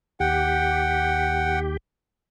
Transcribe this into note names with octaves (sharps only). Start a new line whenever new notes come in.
D#2 G4 F#5 G5